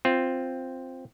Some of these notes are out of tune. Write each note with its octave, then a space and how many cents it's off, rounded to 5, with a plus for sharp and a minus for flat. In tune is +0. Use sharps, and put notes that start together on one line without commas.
C4 +0 F4 +0